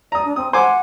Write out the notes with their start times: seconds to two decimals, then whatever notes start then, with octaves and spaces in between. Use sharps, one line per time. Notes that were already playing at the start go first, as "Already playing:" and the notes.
0.12 D5 A#5 D#6
0.24 D4
0.36 C4 D#6
0.53 C5 F#5 G#5 D6